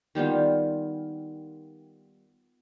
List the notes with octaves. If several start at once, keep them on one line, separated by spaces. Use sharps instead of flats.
D#3 G3 B3 F4